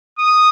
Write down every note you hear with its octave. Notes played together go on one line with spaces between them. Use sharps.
D#6